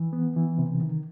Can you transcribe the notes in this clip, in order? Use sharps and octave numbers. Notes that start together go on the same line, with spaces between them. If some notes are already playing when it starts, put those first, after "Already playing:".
Already playing: E3
B3
E3
C3
D#3